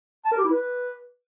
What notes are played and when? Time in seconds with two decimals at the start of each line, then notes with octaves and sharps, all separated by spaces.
0.25 A5
0.31 A#4
0.38 G4
0.44 E4
0.51 B4